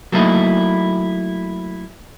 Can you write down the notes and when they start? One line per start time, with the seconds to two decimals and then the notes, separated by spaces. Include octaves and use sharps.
0.12 F#3 A3 A#3 D#4 E4